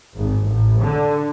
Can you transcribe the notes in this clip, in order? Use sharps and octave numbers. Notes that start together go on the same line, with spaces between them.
G#1
A1
D3